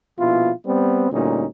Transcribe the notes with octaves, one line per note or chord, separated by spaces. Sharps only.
A#1 B2 E4 F4
G3 B3 C4
D2 A#2 G3 C#4 D#4